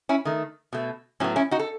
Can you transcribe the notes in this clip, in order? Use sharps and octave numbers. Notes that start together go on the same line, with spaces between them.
C#4 E4
D#3 A3
B2 A3
A2 F#3 B3 C#4
C#4 E4
D#4 F#4
A4